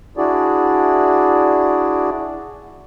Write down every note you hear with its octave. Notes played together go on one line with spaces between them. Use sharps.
D4 E4 F#4 G#4 D5